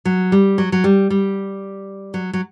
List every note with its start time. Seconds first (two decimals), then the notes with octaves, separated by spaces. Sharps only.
0.05 F#3
0.32 G3
0.58 F#3
0.72 F#3
0.84 G3
1.10 G3
2.14 F#3
2.33 F#3